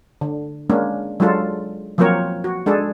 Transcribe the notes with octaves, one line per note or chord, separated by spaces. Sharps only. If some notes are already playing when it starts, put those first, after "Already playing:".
D3
G#3 A#3 C#4 D4
F#3 G#3 D4 F4 A4
F3 F#3 A#3 C4 A#4 C#5
F#4
G#3 D4 G#4 A4